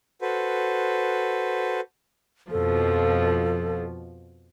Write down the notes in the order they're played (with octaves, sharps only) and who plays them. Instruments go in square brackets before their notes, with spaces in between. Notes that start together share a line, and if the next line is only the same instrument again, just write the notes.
[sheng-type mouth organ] F#4 A4 B4 C5
[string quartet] F2 B2 F3 [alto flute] A4